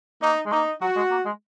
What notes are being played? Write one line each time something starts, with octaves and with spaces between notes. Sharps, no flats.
A#3 D#4
G#3
A#3 D#4
F#3 F#4
G#3
A#3
G#3